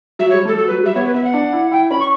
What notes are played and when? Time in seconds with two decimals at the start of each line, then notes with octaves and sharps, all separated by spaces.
0.19 F#3 E5
0.30 G3 C#5
0.45 A3 A4
0.58 F#3 A4
0.67 B4
0.71 F#3
0.83 G3 E5
0.95 B3 C#5
1.05 B4
1.14 B3 E5
1.24 F#5
1.34 D4
1.53 E4
1.71 E4 G5
1.90 C#4 B5
2.00 C#6